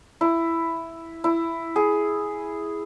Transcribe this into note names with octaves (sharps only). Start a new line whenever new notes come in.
E4
E4
G#4